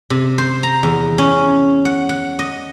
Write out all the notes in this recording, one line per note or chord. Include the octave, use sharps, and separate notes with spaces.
C3
C5
A#5
E2
C#4
F#5
F#5
D#5